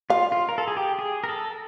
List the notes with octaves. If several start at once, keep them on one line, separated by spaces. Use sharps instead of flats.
F4 F5
F4
A#4
A4
G#4
G4
G#4
A#4
A4